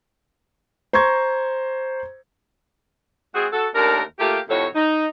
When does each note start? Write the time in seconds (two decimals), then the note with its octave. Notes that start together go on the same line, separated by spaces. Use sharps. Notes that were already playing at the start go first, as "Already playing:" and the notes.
0.93 C5 A#5 C6 C#6 G#6
3.34 G#3 C4 F#4 G#4
3.52 F#4 A4
3.74 D#2 A3 D4 A#4
4.19 A3 A#3 F4 G4
4.49 F2 A2 C3 F#4 A4 C#5
4.75 D#4